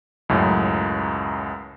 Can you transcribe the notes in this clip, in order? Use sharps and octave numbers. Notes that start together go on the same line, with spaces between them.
C#2 F#2 A2